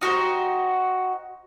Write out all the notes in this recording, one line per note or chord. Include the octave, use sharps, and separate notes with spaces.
D#4 F#4 G4 C5